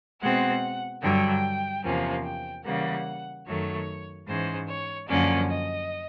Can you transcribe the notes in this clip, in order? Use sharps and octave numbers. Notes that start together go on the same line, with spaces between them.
B2 G#3 C4 F#5
G2 D3 F#3 G5
E2 C3 F3 A#3 C#4
G5
C#3 E3 G3 A#3 F#5
F#2 D#3 F#3 A3 C#5
G#2 E3 G#3 C#4 C5
C#5
F#2 D3 F3 A#3 C#4 D5
D#5